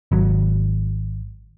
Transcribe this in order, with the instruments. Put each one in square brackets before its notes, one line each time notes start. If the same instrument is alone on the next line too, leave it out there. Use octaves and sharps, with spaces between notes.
[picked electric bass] G#1 F#3